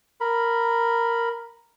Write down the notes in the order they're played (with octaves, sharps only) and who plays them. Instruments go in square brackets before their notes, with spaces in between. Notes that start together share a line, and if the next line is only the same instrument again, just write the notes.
[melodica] A#4 B5